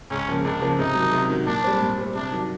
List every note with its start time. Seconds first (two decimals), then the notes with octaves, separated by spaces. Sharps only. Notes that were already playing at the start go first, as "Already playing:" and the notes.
0.10 C#2 C#4
0.27 C#3 F3 A#3
0.44 C#2 D4
0.62 C#3 F3 A#3
0.79 C3 D#4
0.95 D#3 F#3
1.13 C3
1.30 D#3 F#3
1.46 A#2 D4
1.64 G3 C4
1.80 A#2
1.98 G3 C4
2.15 C3 D4
2.32 D#3 F#3